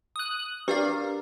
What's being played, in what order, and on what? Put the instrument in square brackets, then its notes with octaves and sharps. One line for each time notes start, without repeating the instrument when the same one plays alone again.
[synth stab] D#6 F#6
[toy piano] D4 G4 B4 [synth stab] A#4 D5 F5